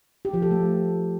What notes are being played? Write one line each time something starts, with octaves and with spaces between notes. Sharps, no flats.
G4
F3
A4
A3